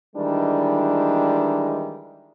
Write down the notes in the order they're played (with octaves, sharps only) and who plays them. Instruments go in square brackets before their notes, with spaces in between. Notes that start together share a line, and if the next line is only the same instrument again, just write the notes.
[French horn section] D#3 E3 G3 G#3 D4